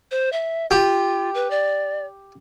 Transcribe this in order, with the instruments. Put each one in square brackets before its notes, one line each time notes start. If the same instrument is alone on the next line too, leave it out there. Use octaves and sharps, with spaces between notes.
[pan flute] C5
E5
[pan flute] F4 [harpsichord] G4
[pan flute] B4
D5